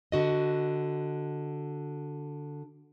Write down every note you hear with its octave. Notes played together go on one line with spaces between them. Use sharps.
D3 F#4 D#5